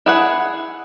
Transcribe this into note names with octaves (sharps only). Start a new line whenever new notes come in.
E4 G#4 F#5